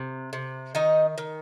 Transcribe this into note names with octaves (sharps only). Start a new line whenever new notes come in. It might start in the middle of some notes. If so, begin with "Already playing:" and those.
Already playing: C3
C3
D#3 D#4 D#5
D#3